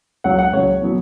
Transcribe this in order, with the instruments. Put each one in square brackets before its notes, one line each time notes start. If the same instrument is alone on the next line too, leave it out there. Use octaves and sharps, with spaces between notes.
[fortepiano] C#2 C#3 F#3 F#5
F#5
C#2 C#3 F#3 C#5
B2 F#3 B3